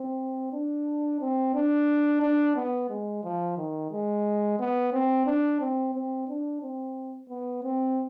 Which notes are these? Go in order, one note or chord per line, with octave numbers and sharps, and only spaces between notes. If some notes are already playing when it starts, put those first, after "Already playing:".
Already playing: C4
D4
C4
D4
D4
B3
G#3
F3
D#3
G#3
B3
C4
D4
C4
C4
D4
C4
B3
C4